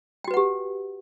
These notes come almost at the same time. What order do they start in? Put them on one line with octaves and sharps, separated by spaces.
G5 F#4 B4 F#5 G4